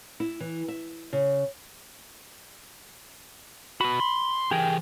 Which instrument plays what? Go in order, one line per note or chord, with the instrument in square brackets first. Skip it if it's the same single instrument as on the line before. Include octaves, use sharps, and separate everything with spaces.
[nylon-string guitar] E4
E3
E5
C#3
[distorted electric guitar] B3 F#4 [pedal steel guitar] B5
[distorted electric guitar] C6
[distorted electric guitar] E3 A#4 [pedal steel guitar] G4 G#4 G5